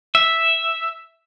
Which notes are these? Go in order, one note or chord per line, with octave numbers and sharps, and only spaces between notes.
E5